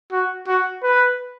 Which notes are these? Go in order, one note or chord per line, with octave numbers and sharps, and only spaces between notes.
F#4
F#4
B4